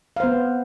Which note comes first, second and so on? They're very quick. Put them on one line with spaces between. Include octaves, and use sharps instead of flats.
F5 C5 B3